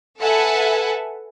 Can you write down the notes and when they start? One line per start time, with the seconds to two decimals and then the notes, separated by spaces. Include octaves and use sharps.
0.20 A4 B4 E5 F#5 G#5 A5